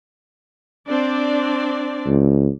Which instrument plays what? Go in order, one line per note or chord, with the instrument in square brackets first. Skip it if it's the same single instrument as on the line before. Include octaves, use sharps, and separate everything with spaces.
[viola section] C4 D4 D5
[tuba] C#2